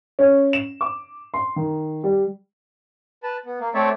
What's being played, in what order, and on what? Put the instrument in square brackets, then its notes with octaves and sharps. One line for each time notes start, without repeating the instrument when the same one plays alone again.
[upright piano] C#4
E7
D6
C6
D#3
G3
[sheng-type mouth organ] B4 A5
B3
A#3
A3 C4 C#5 D5 E5